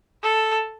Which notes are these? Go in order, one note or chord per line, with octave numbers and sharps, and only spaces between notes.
A4